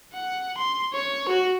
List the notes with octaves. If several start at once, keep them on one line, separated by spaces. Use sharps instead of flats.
F#5
C6
C#5
F#4